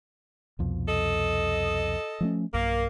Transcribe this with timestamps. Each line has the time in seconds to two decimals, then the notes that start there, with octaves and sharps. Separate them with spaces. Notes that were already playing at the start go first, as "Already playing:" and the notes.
0.59 C2 F2 B2
0.88 A4 D#5
2.21 F3 A3 C#4
2.54 B1 G2 A#3